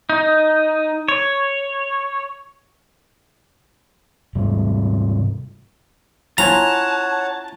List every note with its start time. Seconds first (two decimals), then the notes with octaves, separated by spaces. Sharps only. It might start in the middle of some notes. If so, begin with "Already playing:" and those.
0.09 D#4
1.08 C#5
4.35 G#2 C3 G3
6.38 C#4 E4 F4 C#5 F#5 A5 A#5